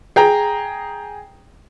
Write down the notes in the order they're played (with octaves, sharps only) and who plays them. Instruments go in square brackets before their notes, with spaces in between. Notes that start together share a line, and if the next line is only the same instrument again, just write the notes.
[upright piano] G#4 G5 A#5